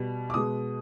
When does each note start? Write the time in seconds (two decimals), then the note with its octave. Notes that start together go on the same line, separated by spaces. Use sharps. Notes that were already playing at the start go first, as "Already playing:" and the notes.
Already playing: B2 G3
0.30 D6
0.34 B2 G#3 D#6